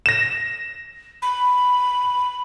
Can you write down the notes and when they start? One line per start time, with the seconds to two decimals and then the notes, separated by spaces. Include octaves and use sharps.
0.06 A#6 E7
1.22 B5